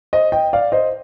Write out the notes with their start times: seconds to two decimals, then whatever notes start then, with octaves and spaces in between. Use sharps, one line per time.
0.13 C5 D#5
0.32 D#5 G5
0.53 D5 F5
0.72 C5 D#5